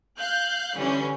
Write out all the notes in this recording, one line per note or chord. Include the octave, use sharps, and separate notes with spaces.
F5 F#6 G6
D3 E3 G3 C#4